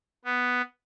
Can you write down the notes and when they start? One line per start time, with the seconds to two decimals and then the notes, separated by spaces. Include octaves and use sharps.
0.25 B3